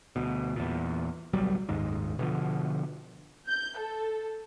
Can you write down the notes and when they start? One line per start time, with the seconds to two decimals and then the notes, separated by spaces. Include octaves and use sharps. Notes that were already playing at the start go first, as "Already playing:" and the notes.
0.16 D2 B2
0.56 E2 A#2
1.33 D1 B1 F#3 G3
1.69 F#1 D#2 G#2 D#3
2.19 B2 D3 F3
3.48 G6
3.78 A4